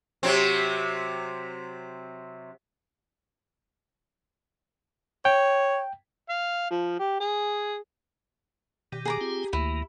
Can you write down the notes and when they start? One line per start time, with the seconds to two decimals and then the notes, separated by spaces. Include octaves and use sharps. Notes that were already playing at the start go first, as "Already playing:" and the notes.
0.23 C3 F#3 C4
5.25 C#5 G5
6.29 F5
6.71 F3
6.99 G4
7.20 G#4
8.92 B2 D#3 G4
9.05 G#4 A#5 D6
9.21 C4 F4 G#5
9.53 D2 D#3 A#3 E4